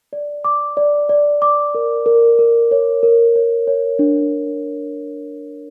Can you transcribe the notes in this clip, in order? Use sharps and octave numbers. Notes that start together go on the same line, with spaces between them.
D5
D6
D5
D5
D6
A#4
A#4
A#4
C#5
A#4
C#5
C#5
D4